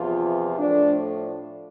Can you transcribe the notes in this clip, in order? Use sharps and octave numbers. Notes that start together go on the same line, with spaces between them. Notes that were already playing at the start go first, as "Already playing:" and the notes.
Already playing: E2 C3 F3 F4
A2 F3 A3 D4